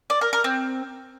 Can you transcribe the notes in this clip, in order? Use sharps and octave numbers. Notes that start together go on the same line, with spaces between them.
D5
A#4
A#4
C4